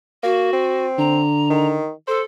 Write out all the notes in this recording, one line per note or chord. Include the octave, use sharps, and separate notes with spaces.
A#3 F#4
C4
D3 A#5
D#3
A4 C5